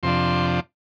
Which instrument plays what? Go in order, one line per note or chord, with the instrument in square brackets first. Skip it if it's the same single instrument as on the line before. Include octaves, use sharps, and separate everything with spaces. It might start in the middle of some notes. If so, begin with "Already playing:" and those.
[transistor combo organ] F2 C3 F3 D4 C6